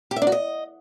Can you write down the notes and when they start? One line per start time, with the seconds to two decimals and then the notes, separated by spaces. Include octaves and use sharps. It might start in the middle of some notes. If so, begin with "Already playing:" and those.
0.11 G4
0.16 E5
0.22 D4
0.27 F#4
0.32 D#5